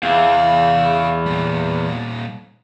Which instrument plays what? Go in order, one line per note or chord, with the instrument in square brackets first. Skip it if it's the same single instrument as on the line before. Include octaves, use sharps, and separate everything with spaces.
[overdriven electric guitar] E2 [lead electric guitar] G#4 F5
[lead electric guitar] A#2 G3